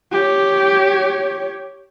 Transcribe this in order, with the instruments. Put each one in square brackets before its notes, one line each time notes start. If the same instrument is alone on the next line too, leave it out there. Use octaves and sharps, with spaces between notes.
[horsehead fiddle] G4 C#5